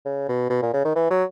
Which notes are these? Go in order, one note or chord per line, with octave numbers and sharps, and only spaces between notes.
C#3
B2
B2
A#2
C#3
D#3
E3
F#3